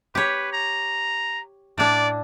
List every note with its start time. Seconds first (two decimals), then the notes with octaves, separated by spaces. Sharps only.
0.15 G4 B4 C#5
0.53 A#5
1.78 A2 D4 D5